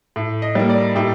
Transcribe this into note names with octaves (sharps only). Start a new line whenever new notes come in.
A2
D#5
G3 A#3
D5
A2 G4